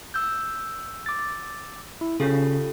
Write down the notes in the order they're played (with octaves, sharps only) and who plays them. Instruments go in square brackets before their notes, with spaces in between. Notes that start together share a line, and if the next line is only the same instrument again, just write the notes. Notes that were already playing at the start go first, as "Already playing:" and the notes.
[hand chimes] E6 G6
[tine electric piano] D6 A6
E4
[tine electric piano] C#3 C#4 [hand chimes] F4 G4 A4